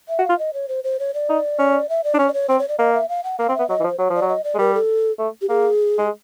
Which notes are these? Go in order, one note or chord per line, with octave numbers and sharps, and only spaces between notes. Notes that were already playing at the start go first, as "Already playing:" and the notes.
E5
F#4
F5
F4
D#5
C#5
C5
C5
C#5
D5
D#4
C#4
E5
D5
D4
C#4 C#5
D5
C#5
C4 C5
C#5
D5
A#3 D#5
E5
F5
F#5
A#3 F5
C4
B3 E5
F#3 D#5
E3
F3
C5
F#3 C#5
F3 D5
F#3
D#5
D5
G#3
G3 A#4
A4
A3
G4
A#3 G#4
G#3